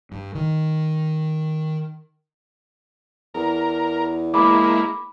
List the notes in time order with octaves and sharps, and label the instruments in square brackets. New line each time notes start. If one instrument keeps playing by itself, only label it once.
[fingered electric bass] G2
D#3
[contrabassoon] E2 [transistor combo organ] A#4
[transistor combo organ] G#3 A#3 E4 [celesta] B5 D6